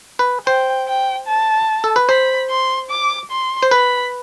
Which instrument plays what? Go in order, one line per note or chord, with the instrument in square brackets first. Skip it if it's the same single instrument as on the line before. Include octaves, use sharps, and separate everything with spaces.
[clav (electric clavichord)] B4
[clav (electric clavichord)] C5 [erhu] G5
[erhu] G5
A5
[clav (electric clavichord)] A4
B4
[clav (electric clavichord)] C5 [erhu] B5
[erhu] C6
D6
C6
[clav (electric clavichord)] C5
[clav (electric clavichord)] B4 [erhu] B5